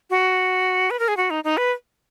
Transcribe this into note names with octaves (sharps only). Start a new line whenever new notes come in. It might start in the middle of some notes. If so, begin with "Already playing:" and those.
F#4
B4
A#4
G#4
F#4
D#4
D#4
B4